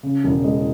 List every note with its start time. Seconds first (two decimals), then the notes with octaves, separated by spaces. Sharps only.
0.03 C#3
0.24 E1
0.44 G#3